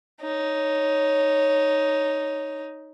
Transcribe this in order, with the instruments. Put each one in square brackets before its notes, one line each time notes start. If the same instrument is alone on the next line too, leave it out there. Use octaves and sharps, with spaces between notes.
[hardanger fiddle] D#4 C#5